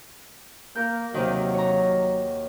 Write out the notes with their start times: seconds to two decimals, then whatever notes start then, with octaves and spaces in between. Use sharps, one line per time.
0.76 A#3 A#4 G6
1.14 D#2 C3 D#3 F#3
1.54 C#5 A#5